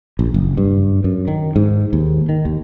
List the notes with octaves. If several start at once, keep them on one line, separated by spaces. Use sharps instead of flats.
A#1
F#1
G2
F#2
D#3
G#2
D#2
D#3
D#2